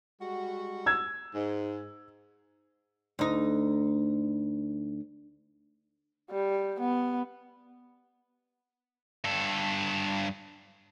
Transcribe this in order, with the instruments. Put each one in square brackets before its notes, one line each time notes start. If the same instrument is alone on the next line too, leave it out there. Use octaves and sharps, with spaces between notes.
[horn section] G3 G#3 F#4
[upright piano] E6 G#6
[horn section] G#2
[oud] D2 D#4
[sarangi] G3
B3
[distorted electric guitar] G2 A4